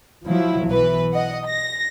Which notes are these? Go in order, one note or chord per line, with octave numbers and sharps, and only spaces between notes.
F3 F#3 E4
B1 E3 B4
D#5 F#5
A#6